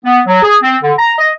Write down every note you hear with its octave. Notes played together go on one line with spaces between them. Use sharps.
B3
F#3
G#4
C4
D3
A#5
D#5